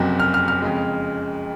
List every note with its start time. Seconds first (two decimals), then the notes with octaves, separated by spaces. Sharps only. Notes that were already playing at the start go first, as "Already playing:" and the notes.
Already playing: F#1 F2 C3 F#3
0.20 F6
0.34 F6
0.48 F6
0.62 F2 C#3 G#3